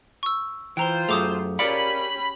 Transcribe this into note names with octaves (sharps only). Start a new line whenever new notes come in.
C#6 E6
E3 F4 C5 G5 A#5 G7
F#2 A3 G#4 D6 D#6
C#4 G4 A#4 D5 F5 B5 C#7